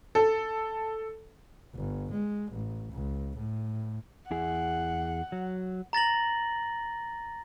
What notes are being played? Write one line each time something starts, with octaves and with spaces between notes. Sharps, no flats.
A4
G1
G#3
A1
C#2
A2
E2 E4 G#4 F#5
F#3
A#5 A6 A#6 F#7